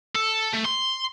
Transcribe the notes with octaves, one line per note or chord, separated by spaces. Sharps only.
A4
A3
C6